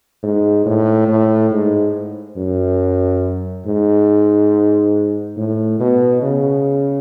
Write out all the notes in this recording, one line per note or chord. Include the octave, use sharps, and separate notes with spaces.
G#2
A2
A2
G#2
F#2
G#2
A2
B2
C#3